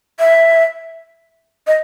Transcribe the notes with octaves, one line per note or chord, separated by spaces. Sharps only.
E5
D#5